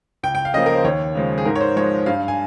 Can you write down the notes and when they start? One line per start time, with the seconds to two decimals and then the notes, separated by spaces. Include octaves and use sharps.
0.23 C#2 G5
0.35 G5
0.45 F5
0.54 C#3 F3 A#3 D#5
0.66 A#4
0.75 C5
0.84 D#2 C#5
1.15 C#3 F3 G#3
1.38 G#4
1.45 G#2 A#4
1.56 C#5
1.61 C5
1.76 F3 G#3 C#5
2.06 G2 F5
2.28 G#5